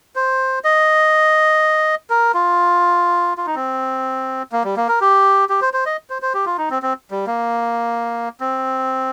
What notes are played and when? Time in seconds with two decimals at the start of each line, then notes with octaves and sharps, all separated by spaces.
0.15 C5
0.64 D#5
2.10 A#4
2.34 F4
3.38 F4
3.46 D#4
3.55 C4
4.52 A#3
4.64 G3
4.77 A#3
4.88 A#4
5.01 G4
5.49 G4
5.61 C5
5.73 C5
5.86 D#5
6.10 C5
6.22 C5
6.34 G4
6.46 F4
6.58 D#4
6.70 C4
6.82 C4
7.11 G3
7.27 A#3
8.40 C4